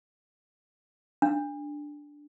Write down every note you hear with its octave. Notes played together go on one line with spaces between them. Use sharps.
D4